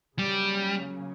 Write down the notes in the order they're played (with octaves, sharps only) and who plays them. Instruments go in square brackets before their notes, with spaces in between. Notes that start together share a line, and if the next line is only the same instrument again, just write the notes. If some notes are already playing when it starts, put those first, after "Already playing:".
[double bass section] C#3 F#3 A#3 C#4 [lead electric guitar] G3